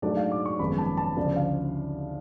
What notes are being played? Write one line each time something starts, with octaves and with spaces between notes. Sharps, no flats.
G#2 F#3 A3 D4 D5
F5
D6
C#6
G#1 F#2 F3 G#3 B3 B5
A5
A5
D2 C#3 F3 D5
F5